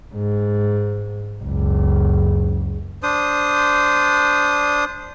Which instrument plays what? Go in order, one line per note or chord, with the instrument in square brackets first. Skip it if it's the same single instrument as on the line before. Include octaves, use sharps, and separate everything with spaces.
[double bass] G#2
F#1 C#2
[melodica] D4 C5 D#6